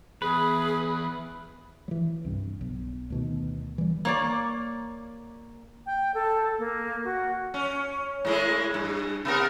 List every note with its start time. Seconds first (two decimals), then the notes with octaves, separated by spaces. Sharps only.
0.22 E2 G#4 B4
1.88 E3 F#3
2.25 C2 G2
2.61 B1
3.10 D2 B2 D#3
3.78 E3 G3
4.05 A#3 C#5 D5
5.86 G5
6.14 A4
6.59 A#3
7.04 F#4
7.54 C#4
8.25 A2 G#3 E4
8.74 G2
9.25 C3 B3 A#4